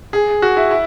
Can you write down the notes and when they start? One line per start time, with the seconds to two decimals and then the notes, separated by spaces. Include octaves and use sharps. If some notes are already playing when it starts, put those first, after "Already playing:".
0.13 G#4
0.42 F#4
0.57 E4
0.71 E4